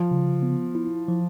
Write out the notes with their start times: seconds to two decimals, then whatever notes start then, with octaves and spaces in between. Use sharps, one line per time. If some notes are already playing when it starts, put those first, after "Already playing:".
Already playing: F3
0.11 C#3
0.42 B3
0.75 E4
1.08 F3